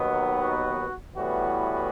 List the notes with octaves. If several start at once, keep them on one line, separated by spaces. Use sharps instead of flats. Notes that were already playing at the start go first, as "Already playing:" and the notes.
Already playing: D#2 D#3 F#3 B3
F#4
A2 E3 G3 B3 F#4